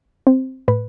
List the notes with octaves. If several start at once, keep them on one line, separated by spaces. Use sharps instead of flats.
C4
A2 B4